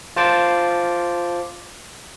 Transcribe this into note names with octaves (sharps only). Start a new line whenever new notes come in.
F4 C5 A5 D6